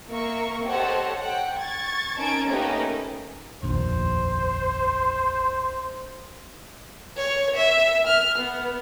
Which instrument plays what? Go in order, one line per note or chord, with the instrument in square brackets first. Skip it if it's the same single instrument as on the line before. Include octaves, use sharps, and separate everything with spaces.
[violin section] A#3 A#4 E5 C#6
G4 A4 C5 C#5 D#5 F#5
F#5 G5
C#6 G#6 A6
C#4 D#4 A#4 A5 G#6 D7
A3 A#3 C#4 D#4 G4 B4
[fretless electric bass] F1 A#1 D#2 [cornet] C5
[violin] C#5
E5
F6
B3